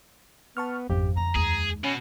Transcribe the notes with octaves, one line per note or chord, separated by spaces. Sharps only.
B3 A5 C#6 F6
G#1 F2 C#4 G4
D3 A#5
D#2 G#3 G#4
B2 C#4